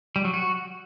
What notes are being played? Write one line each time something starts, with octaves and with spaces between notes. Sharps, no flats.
G3
F#3
F#4